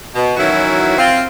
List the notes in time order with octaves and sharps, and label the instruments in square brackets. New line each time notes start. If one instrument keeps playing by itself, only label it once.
[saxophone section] B2
D#3 E3 F#3 C#4 E4 F#4
C4 F4